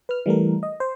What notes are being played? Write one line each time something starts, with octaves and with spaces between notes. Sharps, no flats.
B4 F6
E3 G3 A3 A#4
D#5
C5